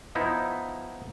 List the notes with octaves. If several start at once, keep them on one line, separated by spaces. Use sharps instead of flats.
F3 B3 D#4 E4